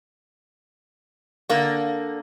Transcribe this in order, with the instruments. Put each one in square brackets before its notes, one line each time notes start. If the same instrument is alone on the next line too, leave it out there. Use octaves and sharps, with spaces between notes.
[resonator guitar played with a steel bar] D3 A#3